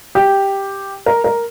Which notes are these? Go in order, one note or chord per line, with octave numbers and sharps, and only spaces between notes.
G4
A#4
A#4